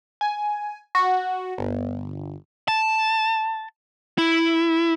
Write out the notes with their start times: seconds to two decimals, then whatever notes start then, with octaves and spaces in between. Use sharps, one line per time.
0.21 G#5
0.95 F#4
1.58 G1
2.68 A5
4.18 E4